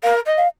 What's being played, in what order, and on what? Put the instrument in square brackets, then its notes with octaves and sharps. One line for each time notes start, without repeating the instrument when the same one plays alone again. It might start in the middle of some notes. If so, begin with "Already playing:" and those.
[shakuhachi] A#4 [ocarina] F5
[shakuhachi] D#5
[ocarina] F5